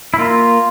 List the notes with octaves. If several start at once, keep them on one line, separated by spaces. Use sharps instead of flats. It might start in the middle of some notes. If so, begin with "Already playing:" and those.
E4
A#3 F4